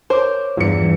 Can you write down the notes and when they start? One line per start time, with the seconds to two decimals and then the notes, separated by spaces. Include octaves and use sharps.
0.10 A#4 C5 C#5 D6
0.57 E2 G2 E3 F4 C#7